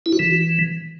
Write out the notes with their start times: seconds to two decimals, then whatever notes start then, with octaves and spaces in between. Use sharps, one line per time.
0.06 E4
0.13 F#4
0.19 E3